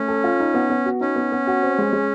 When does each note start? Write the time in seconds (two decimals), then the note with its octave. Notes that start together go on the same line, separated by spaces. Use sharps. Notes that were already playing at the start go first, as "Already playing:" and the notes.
Already playing: A3 C#4
0.08 A4
0.24 F4
0.40 D#4
0.54 B3
0.70 B3
0.86 F#4
1.01 C#4 D#4
1.16 B3
1.32 B3
1.47 F#4
1.63 C4
1.78 G#3
1.93 G#3